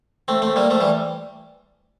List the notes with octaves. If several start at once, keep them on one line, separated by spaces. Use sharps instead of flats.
A3 C4
A3 C4
G3 A#3
F3 A3
E3 G3